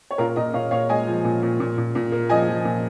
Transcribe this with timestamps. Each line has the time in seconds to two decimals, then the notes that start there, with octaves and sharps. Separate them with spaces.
0.11 C#5
0.18 A#2 F4 A#4
0.36 A#2 A#4 D#5
0.53 A#2 C#5 F5
0.71 A#2 C#5 F5
0.89 G#3 D#5 G#5
1.07 F3
1.24 A#2
1.43 A#2
1.60 A#2
1.78 A#2
1.95 A#2
2.12 A#3
2.29 F3 D#5 G#5
2.48 F3
2.65 A#2